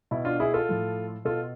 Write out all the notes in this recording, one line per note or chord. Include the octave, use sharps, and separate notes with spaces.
B2 E4
D4 F4
E4 G#4
F4 A4
A2 F3
B2 F4 A4